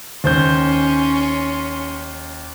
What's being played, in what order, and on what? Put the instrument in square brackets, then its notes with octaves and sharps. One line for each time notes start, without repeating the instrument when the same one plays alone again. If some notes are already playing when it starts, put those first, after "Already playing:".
[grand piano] D#2 C5 G6 [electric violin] C#4 C6